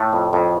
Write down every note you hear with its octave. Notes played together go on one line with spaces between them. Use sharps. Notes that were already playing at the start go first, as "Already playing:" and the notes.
Already playing: A2 A3
F2
F2